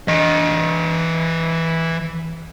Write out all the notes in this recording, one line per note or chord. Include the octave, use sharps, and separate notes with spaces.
E3 D#5